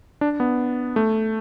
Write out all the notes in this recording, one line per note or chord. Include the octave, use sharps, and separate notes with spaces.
D4
B3
A3